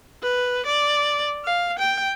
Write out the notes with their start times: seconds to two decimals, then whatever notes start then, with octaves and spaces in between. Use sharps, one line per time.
0.23 B4
0.66 D5
1.45 F5
1.79 G5